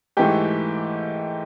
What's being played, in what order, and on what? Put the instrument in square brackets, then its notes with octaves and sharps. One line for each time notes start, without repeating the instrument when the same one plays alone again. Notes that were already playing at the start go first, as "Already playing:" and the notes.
[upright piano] G#2 E3 A3 G4 G5